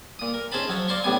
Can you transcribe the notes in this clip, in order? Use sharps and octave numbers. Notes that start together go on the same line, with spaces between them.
A#2 D#6
A#4
C#4 D#4 G#4 C5 A5 B5
F3 F#3 C#5
C5 D5 F5 A#5 C6 C#6
A1 A2 G3 B3 G#5